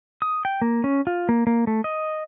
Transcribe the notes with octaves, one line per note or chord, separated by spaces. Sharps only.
D#6
G5
A#3
C#4
F4
A#3
A#3
A3
D#5